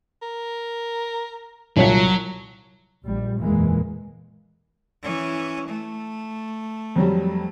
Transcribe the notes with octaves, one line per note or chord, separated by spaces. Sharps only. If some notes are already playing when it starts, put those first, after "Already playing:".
A#4
C2 A#2 F#3 G3 F4 C#5 B6
A#1 G3
F#1 E2 A#2 E3 G#3 A#3
E3 C#4
A3
F2 F#3 G3